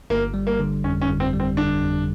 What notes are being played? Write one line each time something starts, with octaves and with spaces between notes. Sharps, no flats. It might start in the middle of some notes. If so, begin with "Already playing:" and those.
G1 A#3
G3
A#3
D3
F2 C#4
C#4
G1
C4
G3
C4
D3 D4
F2